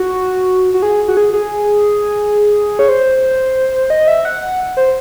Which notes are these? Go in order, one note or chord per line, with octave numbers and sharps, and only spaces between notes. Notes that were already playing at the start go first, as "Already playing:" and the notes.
Already playing: F#4
F#4
G#4
F#4
G#4
G#4
C#5
C5
D#5
E5
F#5
F#5
C5